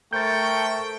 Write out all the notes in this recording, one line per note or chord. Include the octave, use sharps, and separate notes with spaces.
A3 A#4 C5 G5 C#6 G6 A6